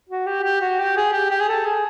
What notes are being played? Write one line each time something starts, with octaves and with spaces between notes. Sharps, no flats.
F#4
G4
G4
F#4
G4
G#4
G4
G4
G#4
A4
G#4